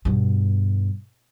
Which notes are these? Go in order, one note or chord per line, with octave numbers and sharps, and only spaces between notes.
G2 B2